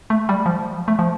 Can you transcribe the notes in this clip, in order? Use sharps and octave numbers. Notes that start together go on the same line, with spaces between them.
A3
G3
F3
A3
F3